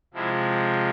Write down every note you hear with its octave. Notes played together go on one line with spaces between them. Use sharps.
C3 F3 G#3 E4